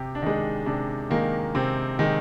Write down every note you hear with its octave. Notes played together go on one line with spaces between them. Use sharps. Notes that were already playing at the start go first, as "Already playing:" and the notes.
Already playing: C3 G4
D4
D#3 G#3 D#4
C3 D4
D#3 G#3 A#3
C3 C4
D#3 G#3